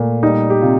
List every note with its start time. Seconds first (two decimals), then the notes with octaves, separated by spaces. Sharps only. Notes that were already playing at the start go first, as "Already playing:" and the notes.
Already playing: A#2 A3
0.23 G3 D#4
0.50 G4
0.62 C3 F4